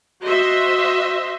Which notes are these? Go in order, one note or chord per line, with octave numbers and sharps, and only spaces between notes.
F#4 C5 D#5 E5